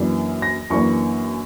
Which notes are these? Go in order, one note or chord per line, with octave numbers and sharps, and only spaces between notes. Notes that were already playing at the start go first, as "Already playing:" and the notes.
Already playing: F#2 E3 A#3 D4
A#6
F#2 E3 A#3 D4 C#6